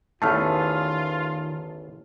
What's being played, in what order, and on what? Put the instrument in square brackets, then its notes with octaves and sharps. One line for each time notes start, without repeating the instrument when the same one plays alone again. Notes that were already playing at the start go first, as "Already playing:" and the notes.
[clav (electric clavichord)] A1 E2 A3 [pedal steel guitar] D#3 G#4 [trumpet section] F4 [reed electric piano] A5 F6